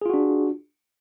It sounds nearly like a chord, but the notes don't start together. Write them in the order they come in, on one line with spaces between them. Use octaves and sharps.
G#4 F4 F#4 D4